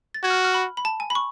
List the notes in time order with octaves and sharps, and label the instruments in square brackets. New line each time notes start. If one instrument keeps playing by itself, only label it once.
[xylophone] A6
[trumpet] F#4 [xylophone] G#6
[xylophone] F6
F#6
F6
B5
B5
A5
G#5
B5
C#6